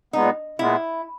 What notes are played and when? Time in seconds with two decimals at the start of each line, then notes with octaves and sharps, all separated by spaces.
0.13 A#2 G#3 B3 D#4
0.59 A#2 G#3 B3 E4